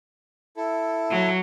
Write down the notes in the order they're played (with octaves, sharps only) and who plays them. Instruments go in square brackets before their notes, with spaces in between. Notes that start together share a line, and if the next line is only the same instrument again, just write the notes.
[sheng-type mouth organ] E4 A4
[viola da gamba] F#3